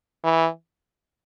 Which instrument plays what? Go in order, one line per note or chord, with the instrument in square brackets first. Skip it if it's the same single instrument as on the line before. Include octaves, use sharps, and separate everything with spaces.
[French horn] E3